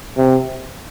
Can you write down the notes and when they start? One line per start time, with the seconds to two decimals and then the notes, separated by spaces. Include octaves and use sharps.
0.18 C3